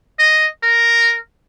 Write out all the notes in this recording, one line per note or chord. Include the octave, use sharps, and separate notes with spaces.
D#5
A#4